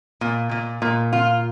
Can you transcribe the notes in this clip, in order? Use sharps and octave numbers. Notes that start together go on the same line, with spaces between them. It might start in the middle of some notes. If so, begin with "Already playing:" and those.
A#2
A#2
A#2
F4